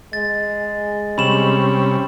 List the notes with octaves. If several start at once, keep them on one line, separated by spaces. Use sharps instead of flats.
G#3 A6
C3 G3 C#4 B5 E7 F#7